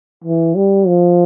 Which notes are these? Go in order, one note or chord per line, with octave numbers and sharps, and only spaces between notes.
E3
G3
F3